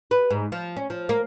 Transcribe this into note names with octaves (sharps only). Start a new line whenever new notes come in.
B4
G#2
F3
C#4
F3
A#3